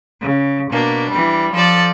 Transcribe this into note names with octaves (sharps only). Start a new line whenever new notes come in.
C#3
B2 A#3 D4
E3 G3
F3 A4 D5